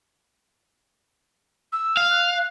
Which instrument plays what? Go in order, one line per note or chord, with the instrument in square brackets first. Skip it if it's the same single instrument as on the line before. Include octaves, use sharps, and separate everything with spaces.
[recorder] E6
[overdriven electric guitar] F5
[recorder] F#6